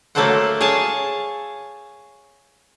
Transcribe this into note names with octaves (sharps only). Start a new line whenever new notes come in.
F#3 A3 A#3 A4 C5 F#5
G#4 C#5 F5 G#5 A5